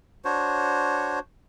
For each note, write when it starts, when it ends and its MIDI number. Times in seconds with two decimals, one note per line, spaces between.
0.25 1.19 62
0.25 1.19 66
0.25 1.19 72
0.25 1.19 73